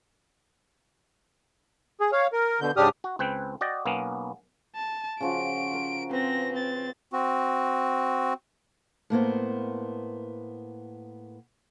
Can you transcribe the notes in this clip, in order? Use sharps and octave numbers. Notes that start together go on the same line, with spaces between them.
G#4
C#5 F5
A#4
B2 D3 G6
G#2 C#3 D4 G4 D#6 F6
F#4
C#2 C4 B4 G5
F#4 D5 D#5 G5
B1 A#3 B3 C#4
A5
C#3 F3 F#4 D7
A#4
C4 B4 A#6
C4 A6
C4 F#4
A2 A#3 B3 C5